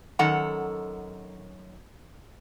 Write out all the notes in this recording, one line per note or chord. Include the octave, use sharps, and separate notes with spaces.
F#2 D#3 A4 F#5 A#5